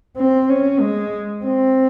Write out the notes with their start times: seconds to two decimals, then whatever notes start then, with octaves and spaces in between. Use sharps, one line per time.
0.17 C4
0.49 C#4
0.81 G#3
1.43 C4